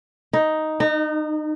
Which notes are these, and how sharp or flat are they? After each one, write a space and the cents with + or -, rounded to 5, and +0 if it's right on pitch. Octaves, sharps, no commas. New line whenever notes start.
D#4 +5
D#4 -30